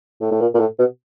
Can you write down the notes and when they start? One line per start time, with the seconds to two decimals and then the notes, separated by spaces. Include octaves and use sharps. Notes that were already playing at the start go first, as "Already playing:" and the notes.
0.21 A2
0.31 A2
0.41 A#2
0.55 A#2
0.60 A2
0.79 B2